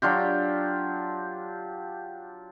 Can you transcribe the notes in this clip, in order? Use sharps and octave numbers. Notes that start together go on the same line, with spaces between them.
F#3 D4 F4 G4